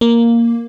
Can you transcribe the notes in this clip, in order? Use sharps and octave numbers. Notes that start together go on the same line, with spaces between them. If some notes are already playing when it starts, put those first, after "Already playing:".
A#3